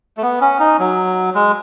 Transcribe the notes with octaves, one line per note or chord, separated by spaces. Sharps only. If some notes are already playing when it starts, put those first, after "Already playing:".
A3
B3
C#4
D#4
F#3
G#3